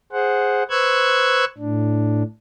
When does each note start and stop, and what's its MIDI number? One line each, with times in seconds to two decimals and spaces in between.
0.12 0.63 68
0.12 0.63 72
0.12 0.63 78
0.70 1.45 71
0.70 1.45 72
0.70 1.45 85
0.70 1.45 88
0.70 1.45 90
0.70 1.45 92
1.58 2.23 45
1.58 2.23 62